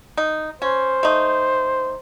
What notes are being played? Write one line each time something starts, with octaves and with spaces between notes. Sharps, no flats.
D#4
C#4 C5
A3 D#4